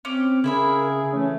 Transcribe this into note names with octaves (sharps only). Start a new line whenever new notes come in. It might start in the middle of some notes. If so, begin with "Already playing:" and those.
C4 C#4 D6
C#3 E4 G#4 A#4 E5 B5
E3 A3 C#4